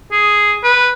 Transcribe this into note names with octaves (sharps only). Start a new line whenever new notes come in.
G#4
B4